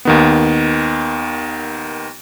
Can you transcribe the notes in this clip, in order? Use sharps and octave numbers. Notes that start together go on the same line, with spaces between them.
D#2 D#3 B3